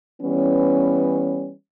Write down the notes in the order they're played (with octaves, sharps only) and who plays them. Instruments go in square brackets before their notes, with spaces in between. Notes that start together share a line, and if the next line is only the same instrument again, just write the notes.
[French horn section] E3 G3 B3 C#4